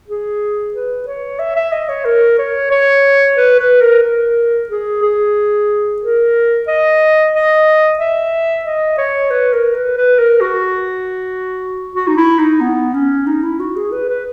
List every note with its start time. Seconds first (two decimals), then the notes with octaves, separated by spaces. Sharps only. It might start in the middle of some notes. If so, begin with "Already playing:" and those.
0.08 G#4
0.74 B4
1.07 C#5
1.39 E5
1.56 E5
1.72 D#5
1.89 C#5
2.05 A#4
2.39 C#5
2.71 C#5
3.37 B4
3.59 B4
3.81 A#4
4.03 A#4
4.69 G#4
5.02 G#4
6.02 A#4
6.67 D#5
7.33 D#5
7.99 E5
8.65 D#5
8.98 C#5
9.30 B4
9.53 A#4
9.74 B4
9.97 B4
10.19 A#4
10.41 F#4
11.95 F#4
12.07 D#4
12.17 E4
12.39 D#4
12.61 B3
12.94 C#4
13.27 D#4
13.43 E4
13.60 F#4
13.76 G#4
13.92 B4
14.09 B4